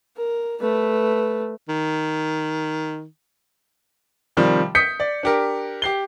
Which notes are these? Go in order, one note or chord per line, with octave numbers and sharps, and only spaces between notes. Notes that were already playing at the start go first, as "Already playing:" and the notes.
A#4
A3 B4
D#3
C3 D#3 F3 G3
D#6 G6 B6 C#7
D5
D4 G4 A#4
G4 C7 G7